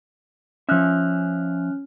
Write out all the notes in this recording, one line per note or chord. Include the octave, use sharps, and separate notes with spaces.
F3 C#4 E5 F6 F#6